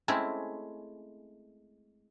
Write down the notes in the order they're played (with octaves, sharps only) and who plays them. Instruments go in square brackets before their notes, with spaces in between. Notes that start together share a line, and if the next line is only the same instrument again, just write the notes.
[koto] G#3 A3 C4 C#4 E4